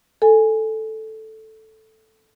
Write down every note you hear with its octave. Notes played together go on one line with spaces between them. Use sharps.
A4 G#5